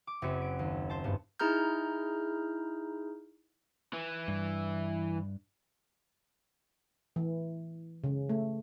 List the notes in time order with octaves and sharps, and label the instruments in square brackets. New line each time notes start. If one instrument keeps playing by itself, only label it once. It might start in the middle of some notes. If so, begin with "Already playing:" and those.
[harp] D6
F#1 F#2 G#3 C4 F#4 B6
D7
D#2
C5 A5
G2 B3
[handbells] D#4 E4 G#4 A#5 F6 G6
[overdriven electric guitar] E3
[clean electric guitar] G2
[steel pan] E3
C#3
A3